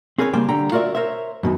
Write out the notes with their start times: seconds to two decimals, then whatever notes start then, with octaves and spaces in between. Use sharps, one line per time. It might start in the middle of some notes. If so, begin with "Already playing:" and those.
0.18 C4 G#4 A#4 B4 C#5
0.33 C#3 G3 A#3 C5 G5
0.48 D3 G3 G5 A#5
0.72 F4 F#4 A#4 D5 E5
0.95 A#4 C5 C#5 E5
1.43 F#2 B2 D#3